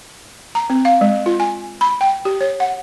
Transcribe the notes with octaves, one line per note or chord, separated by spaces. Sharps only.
A#5
C4
F5
G#3
F4
G#5
B5
G5
G4
C#5
F#5